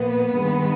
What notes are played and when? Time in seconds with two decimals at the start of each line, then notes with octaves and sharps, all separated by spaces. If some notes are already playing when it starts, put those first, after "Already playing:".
Already playing: A#2 F3 A#3 B3 B4
0.34 G2 D#3 G#3